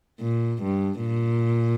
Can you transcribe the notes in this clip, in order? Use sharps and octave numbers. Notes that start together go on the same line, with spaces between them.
A#2
G2
A#2